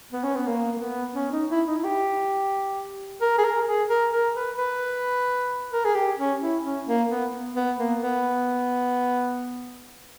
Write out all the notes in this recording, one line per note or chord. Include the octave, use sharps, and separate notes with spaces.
B3
C#4
B3
A#3
A#3
B3
C#4
D#4
E4
D#4
E4
G4
A#4
G#4
A#4
G#4
A#4
A#4
B4
B4
A#4
G#4
G4
C#4
E4
C#4
A#3
B3
B3
A#3
B3